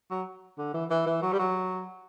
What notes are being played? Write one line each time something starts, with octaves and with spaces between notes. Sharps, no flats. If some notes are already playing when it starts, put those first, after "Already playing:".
F#3
D3
E3
E3
E3
F#3
G3
F#3